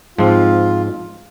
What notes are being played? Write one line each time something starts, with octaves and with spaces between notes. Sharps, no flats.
G#2 F3 C4 F4